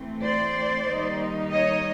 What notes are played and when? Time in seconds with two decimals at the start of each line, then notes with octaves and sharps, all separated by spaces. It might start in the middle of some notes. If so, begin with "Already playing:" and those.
Already playing: E3 A3 C4
0.22 C5 D5
0.87 D#3 G3 A#3 D#4
1.51 C#5 D#5